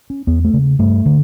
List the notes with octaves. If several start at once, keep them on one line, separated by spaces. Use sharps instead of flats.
C#4
E2 B3
A3
C#3
G2 A3
D3